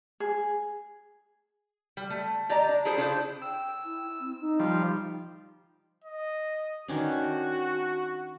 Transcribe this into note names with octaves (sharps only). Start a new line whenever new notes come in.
G#4
G3
A3
G4 D5 D#5 A#5
D4
E4 G#4 A4 C5
D4 E4 F4 G#4 A#4 C5
G5 E6
E4
C4
D#4
F3 G3
D#5
D#3 C#4 D4 F#4